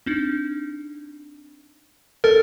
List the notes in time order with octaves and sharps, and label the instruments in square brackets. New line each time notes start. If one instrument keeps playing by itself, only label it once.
[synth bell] C4 D4 D#4
[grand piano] A4 [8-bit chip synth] A#4 [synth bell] A6